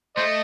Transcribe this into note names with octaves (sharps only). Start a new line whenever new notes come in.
A3 C5 D#5